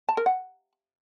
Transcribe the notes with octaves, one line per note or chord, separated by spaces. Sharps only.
A5
A#4
F#5